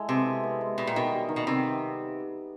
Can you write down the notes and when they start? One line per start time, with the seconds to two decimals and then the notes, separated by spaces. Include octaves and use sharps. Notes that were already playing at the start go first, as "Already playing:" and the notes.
Already playing: G#3 E4 A4
0.09 C3 B3
0.26 E4
0.44 B3
0.61 G#3
0.78 B2 G3
0.87 A#2
0.95 B2 D#3
1.12 G3
1.29 D#3
1.36 B2
1.47 C3 D#3
1.63 B3